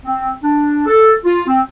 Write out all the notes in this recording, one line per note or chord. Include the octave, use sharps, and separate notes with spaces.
C4
D4
A4
F4
C4